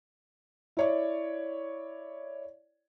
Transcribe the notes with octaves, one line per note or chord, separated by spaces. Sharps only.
E4 C#5 D5